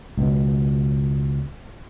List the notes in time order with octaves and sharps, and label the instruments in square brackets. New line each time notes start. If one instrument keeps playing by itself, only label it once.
[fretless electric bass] C#2 B2